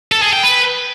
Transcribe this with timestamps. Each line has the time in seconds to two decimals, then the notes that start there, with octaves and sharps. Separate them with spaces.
0.12 A4
0.22 G#4
0.33 G5
0.43 B4